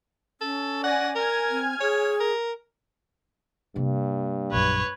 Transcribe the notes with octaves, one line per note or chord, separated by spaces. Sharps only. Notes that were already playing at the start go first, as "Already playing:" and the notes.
C#4 A4
D5 F#5 G#5 A#6
A#4 G#5 F6 G#6
C4
G#4 C#5
A#4
G2 C3 A#3
A#1 F#2 B4 C#5